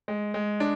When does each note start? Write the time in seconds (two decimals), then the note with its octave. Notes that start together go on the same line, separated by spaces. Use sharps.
0.08 G#3
0.34 G#3
0.60 D4